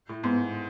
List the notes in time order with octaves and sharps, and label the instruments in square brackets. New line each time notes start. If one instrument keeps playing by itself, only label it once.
[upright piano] A2
[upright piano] G#2 [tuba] B3